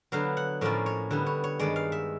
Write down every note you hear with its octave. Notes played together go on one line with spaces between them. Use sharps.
D3 F#3 B3 F5
F#5
A2 F3 A#3 C#4 D5
C#5
D3 G3 B3
C#5
C#5
G2 D#3 G#3 D5
F5
E5